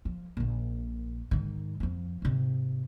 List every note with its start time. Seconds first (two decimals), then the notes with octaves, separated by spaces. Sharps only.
0.05 F3
0.37 A#1 A#2
1.31 G#2 D#3
1.80 F2 F3
2.22 G#2 C3